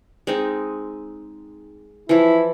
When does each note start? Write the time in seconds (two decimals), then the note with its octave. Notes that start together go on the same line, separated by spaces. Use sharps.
0.27 G#3 C4 D#4
2.09 E3 F3 E4